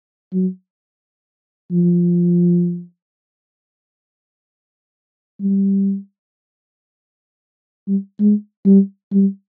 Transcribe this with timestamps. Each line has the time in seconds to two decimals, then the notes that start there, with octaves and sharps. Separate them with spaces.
0.33 F#3
1.71 F3
5.41 G3
7.88 G3
8.20 G#3
8.65 G3
9.12 G3